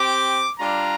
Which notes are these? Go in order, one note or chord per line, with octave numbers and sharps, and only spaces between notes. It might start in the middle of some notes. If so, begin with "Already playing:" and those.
Already playing: C4 G4 D6
G3 D4 F4 A#5